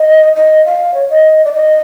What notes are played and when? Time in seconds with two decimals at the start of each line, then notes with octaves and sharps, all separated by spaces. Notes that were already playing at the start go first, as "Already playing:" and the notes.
Already playing: D#5
0.36 D#5
0.65 F5
0.94 C#5
1.09 D#5
1.45 D5
1.53 D#5